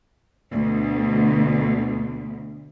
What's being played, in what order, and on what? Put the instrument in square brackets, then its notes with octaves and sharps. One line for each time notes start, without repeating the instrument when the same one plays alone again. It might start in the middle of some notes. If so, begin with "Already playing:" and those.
[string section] D2 B2